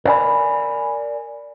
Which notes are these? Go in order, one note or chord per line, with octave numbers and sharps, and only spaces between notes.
A#4 D5 F#5 G#5 B5